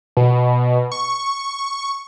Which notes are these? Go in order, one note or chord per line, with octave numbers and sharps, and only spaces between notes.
B2
C#6